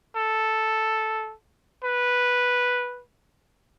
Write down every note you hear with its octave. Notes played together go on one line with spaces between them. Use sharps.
A4
B4